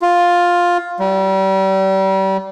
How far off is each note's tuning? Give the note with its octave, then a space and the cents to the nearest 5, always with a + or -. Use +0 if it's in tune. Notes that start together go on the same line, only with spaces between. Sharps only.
F4 +10
G3 -30